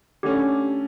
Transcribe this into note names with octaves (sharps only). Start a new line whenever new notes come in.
D3 A3 C#4 G4